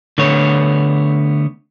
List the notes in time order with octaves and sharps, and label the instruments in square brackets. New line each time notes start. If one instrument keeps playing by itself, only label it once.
[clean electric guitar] D3 A3 B3 C#5